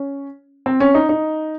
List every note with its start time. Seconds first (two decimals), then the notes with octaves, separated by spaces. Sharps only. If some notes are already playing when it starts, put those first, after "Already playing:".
Already playing: C#4
0.66 C4
0.80 C#4
0.95 D#4
1.09 D#4